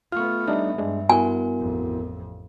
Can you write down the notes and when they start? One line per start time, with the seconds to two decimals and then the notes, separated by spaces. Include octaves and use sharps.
0.12 A3 B3 F4 C#6 F6
0.48 G3 D4 D#4 E5
0.78 G2 G#3 D4
1.09 B3 E4 F#4 A#4 G#5
1.59 A1 F2